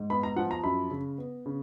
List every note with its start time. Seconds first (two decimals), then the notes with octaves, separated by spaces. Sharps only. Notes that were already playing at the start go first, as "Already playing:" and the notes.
Already playing: G#2
0.10 B3 B5
0.23 A#5
0.37 F3 F#5
0.51 A#5
0.64 F#2 B5
0.91 C#3
1.18 B3
1.46 C#3